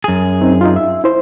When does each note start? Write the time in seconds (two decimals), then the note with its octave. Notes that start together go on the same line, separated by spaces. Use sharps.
0.04 F#2 G#4
0.41 C4 D#4
0.61 D#4 F4
0.76 E5
1.04 E4 C5